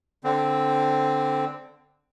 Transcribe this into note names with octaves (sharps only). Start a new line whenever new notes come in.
D3 C4